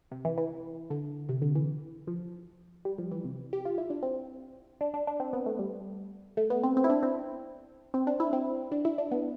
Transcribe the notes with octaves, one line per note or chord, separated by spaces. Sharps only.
C3
E3
E3
D3
C3
D3
E3
F3
G3
F3
E3
C3
G4
F4
E4
D4
C4
D4
D4
D4
C4
B3
A3
G3
A3
B3
C4
C4
E4
D4
C4
C4
D4
E4
C4
D4
E4
D4
B3